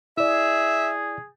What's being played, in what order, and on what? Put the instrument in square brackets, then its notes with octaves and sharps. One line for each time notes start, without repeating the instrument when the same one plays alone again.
[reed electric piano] E4 D5 [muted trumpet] G#4 [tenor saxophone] E5